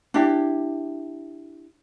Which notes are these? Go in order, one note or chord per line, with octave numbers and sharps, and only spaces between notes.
D4 E4 G4